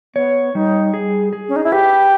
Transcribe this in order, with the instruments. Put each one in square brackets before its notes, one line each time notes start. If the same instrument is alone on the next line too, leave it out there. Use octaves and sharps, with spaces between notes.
[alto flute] B3 [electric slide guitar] C#5
[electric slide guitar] G3 [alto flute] D#4
[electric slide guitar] G#4
G#4
[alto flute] C#4
D#4
E4
[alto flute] G4 [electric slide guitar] B4